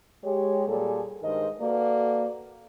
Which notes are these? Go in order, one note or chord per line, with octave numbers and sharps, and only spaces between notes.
G#3 G4 C#5
A#2 G3 G#4 A4
G2 D#3 G#3 A#4 C5 D#5
A#3 F#4 A4 B4 D5